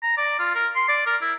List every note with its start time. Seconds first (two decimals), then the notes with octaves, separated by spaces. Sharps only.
0.03 A#5
0.17 D5
0.39 F4
0.55 A#4
0.75 C6
0.88 D5
1.06 A#4
1.22 E4